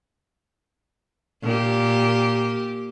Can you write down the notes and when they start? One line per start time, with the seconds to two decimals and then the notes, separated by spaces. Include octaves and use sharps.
1.43 A#2 G4